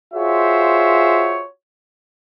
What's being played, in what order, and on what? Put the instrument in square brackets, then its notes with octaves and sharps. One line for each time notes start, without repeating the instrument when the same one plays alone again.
[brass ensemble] F4 F#4 G#4 C5 C#5 E5